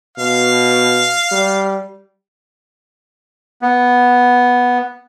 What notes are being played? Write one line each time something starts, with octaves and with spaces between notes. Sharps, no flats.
B2 F5
G3
B3